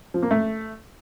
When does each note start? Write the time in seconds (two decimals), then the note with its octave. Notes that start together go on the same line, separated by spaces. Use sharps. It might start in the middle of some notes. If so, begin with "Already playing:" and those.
0.14 F3
0.22 A#3
0.31 A3